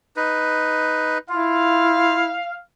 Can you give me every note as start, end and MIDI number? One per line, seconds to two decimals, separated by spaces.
0.16 1.18 63
0.16 1.18 71
1.29 2.37 64
1.29 2.16 65
1.29 2.55 77